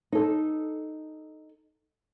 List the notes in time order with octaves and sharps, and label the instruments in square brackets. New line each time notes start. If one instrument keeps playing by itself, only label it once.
[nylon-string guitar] D#4 A4